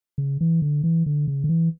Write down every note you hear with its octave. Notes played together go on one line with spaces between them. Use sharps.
C#3
E3
D3
E3
D3
C#3
D3
E3